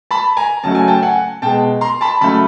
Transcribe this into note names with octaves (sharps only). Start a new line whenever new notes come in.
A5 B5
G#5 A#5
C#3 F#3 A3 A5
G#5
G5 A5
F#5 G#5
B2 G#3 G5 A5
A#5 C6
A5 B5
C#3 F#3 A3 A5 B5